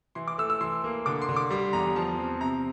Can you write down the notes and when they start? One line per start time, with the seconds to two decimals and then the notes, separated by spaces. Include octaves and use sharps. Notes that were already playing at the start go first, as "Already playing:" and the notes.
0.15 E3 C6
0.28 D6
0.38 A3 E6
0.50 E6
0.61 E3 C6
0.84 A#3
1.06 D3 D6
1.22 C6
1.29 D3
1.36 D6
1.50 G3 C6
1.73 E2 A#5
1.96 F3 A5
2.18 C4
2.41 C3 A#5